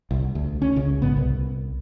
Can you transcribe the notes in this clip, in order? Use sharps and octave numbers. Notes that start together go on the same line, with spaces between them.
C2
D2
C#4
C#2 C#3
A#1 G#2 B3
C2